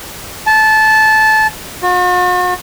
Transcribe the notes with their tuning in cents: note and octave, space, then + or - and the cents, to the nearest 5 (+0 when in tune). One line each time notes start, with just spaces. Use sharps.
A5 -15
F#4 -45